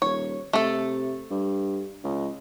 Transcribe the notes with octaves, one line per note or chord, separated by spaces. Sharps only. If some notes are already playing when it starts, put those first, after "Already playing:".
D#1 C#5
C3 A3 A4
G2
C#2